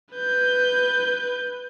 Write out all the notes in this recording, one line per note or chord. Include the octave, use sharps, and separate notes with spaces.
B4 G6